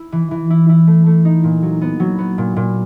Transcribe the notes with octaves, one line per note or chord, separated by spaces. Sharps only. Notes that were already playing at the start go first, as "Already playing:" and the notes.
Already playing: E4
E3
E3
E4
E4
A3
A3
D#4
A#2
F#3
B3
F#3
B3
A#2
A#2